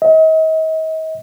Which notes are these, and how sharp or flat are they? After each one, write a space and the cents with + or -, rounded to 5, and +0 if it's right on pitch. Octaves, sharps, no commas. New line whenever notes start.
D#5 +40